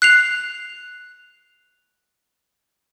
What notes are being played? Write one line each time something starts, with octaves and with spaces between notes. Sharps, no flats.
F#6 C7 F7